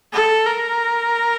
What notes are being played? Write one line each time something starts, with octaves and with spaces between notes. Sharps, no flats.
A4
A#4